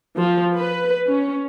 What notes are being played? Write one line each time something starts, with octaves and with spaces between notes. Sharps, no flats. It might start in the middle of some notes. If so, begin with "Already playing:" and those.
F3
B4
C#4